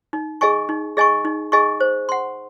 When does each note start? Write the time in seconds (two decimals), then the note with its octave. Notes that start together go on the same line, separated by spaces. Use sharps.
0.13 D#4
0.41 G#4 D#5 G#5 C#6
0.69 D#4
0.97 G#4 D#5 G#5 C#6
1.25 D#4
1.52 G#4 D#5 G#5 C#6
1.80 C5
2.09 F#5 C6